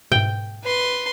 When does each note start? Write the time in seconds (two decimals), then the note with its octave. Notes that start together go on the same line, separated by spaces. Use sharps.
0.12 G#2 B2 G5
0.64 B4 C6